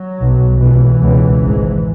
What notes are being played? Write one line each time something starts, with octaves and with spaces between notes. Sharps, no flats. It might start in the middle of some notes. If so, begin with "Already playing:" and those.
Already playing: F#3
B1 B2
C#2 B2 E3
C#2 B2
G#1 G#2